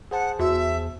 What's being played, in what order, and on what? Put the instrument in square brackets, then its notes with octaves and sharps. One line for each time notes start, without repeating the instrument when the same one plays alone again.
[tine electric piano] G#4 C5 A5 [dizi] F#5
[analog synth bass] E2 [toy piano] F#4 [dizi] E5